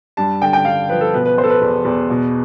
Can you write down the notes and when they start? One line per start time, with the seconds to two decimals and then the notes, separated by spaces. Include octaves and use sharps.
0.17 G2 A5
0.42 D3 G5
0.53 G5
0.65 G2 F5
0.89 F3 B4
1.01 A4
1.14 B2 B4
1.25 B4
1.37 B2 C5
1.43 A4
1.50 B4
1.61 E2
1.85 E2
2.10 B2